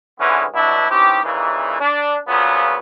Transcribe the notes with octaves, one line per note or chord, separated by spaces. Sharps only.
D3 E3 F3 G#3 B3 C#4
G2 B2 F#3 D4 E4
E3 C4 C#4 D#4 G4
D#2 A#2 C#3 E3
D4
A#2 C#3 F3 F#3 B3